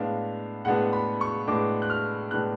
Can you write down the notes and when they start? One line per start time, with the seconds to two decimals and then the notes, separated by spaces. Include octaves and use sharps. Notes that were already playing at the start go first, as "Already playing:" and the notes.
Already playing: A2 G#3 B3 D4 F5
0.65 A2 G#3 B3 D4 F#5
0.93 B5
1.21 C#6
1.47 A2 G#3 B3 D4 D6
1.82 F#6
1.90 F6
2.31 A2 G#3 B3 D4 F#6